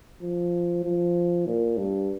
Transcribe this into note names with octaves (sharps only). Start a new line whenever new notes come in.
F3
F3
A#2
G2